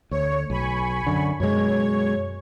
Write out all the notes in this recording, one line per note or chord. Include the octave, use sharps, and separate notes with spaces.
D2 C#5
B1 G#5 B5 C#6
F#2 D3
F#2 B2 G#3 C#5 G#6